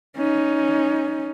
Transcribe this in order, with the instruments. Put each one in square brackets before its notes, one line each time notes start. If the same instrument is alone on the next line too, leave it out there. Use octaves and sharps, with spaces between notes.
[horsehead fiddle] C#4 D#4